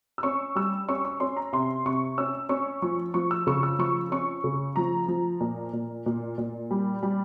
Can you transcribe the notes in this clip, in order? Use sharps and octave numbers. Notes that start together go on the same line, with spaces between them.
E6
C#4 C#6
G3 E6
C#4 C#6
C#6
C#4 C6
A#5
C3 C6
C3 C#6
C#4 E6
C#4 C#6
F3 C#6
F3 C#6
E6
C#3 C#6
E6
F3 C#6
C#4 C#6
C#3
F3 A#5
F3
A#2
A#2
A#2
A#2
G3
G3